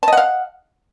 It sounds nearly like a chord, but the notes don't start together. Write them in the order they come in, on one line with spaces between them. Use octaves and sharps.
A5 D#5 F#5 F5